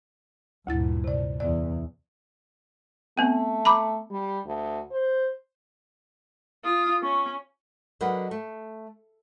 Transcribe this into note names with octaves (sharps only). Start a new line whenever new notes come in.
D2 G2 A#2 E4 A6
C3 D5
E2 D5
A3 B3 C4
A#5 B5 D6
G3
D2
C5
F4 D#6
C#4 C#6
D3 F#3 A#4 B4 D#5 F#5
A3